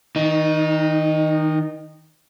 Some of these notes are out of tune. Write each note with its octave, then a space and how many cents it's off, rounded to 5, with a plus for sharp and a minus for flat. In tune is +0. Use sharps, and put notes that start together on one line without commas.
D#3 +30 D#4 -15